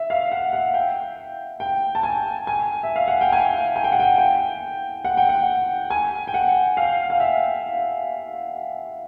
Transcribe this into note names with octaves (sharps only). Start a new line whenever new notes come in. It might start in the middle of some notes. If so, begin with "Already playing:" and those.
Already playing: E5
F5
F#5
F#5
G5
G5
A5
G#5
G#5
E5
F5
F#5
G5
G#5
G#5
G5
F#5
G5
G5
F#5
G5
F#5
G#5
G5
F#5
F5
F5
E5